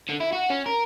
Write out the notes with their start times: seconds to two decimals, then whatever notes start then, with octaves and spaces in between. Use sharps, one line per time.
0.09 D3
0.20 E4
0.32 F#4
0.50 C#4
0.66 A#4